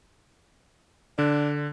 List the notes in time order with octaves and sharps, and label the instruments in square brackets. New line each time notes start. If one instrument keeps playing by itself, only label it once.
[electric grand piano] D3 [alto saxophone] D4